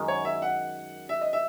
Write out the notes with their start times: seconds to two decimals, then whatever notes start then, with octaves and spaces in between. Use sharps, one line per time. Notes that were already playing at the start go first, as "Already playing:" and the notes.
Already playing: F#2 D#3 G#3 D#4
0.08 C#5
0.25 E5
0.42 F#5
1.09 E5
1.21 D#5
1.33 E5